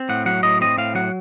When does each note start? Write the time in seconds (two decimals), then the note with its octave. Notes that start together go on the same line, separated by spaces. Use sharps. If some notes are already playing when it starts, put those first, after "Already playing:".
Already playing: C4
0.09 A2 F#5
0.26 F#3 F#5
0.43 A2 D#5
0.61 C4 D#5
0.78 A2 F5
0.95 F#3 F#5